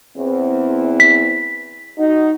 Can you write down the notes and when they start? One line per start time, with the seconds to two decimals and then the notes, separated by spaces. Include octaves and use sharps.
0.17 E2 C4
1.00 B6
1.98 D#4 F#4